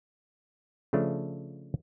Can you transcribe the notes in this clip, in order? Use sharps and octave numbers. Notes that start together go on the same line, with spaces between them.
C#3 F3 A3 D4